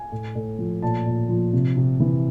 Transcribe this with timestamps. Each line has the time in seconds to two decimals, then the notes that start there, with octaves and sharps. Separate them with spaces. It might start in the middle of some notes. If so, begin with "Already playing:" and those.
Already playing: G#5
0.12 A2
0.35 A2
0.59 F3
0.82 A#2 A5
1.06 A#2
1.29 F3
1.53 C3
1.77 C3
2.00 E3